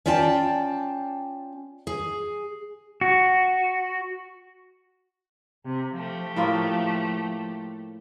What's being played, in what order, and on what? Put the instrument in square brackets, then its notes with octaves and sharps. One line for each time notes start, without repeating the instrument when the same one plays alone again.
[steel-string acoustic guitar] C#4 F4 D5 G5 A5
G#4
[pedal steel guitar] F#4
[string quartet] C3
F3 A3 G4
[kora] A2 A#3 F4